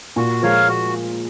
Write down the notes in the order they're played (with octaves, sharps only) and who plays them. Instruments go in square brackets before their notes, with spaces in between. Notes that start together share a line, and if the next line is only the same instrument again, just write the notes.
[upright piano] A#2 [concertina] F#4
[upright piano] F3 G#3 [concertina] A#4 C#5 F5
[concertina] F#4